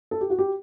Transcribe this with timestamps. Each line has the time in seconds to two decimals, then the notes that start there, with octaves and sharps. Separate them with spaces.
0.11 A4
0.21 G4
0.30 F#4
0.39 G4